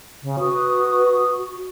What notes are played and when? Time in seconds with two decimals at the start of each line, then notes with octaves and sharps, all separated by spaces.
0.23 C#3
0.39 F#4 B4 D#6